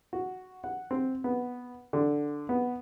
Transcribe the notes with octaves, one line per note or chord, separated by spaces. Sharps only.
F#4
F#5
C4
B3
D3
B3